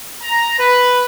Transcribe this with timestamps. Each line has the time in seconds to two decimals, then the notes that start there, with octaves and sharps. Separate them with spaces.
0.22 A#5
0.59 B4